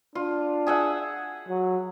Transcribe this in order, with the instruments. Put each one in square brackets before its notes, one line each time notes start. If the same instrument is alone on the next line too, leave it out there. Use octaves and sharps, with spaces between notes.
[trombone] D4 [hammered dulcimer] F4
[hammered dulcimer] G#4 E5 F#5
[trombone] F#3